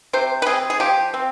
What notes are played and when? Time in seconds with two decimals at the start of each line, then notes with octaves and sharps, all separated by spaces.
0.13 C3 C5
0.42 B4
0.46 C4 G#4
0.70 G#4
0.80 F3 G4
1.14 C4